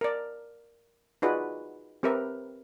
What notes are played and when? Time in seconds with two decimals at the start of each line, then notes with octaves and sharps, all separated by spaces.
0.01 A#4 D5
1.22 D#4 F4 F#4 G#4 B4 D5
2.03 C4 G4 A#4 B4 E5